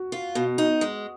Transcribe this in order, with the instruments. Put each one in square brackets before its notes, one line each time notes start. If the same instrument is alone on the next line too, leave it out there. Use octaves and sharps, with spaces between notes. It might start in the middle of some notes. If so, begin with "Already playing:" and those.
Already playing: [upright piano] F#4
[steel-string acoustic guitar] F4
B2
D#4
G#3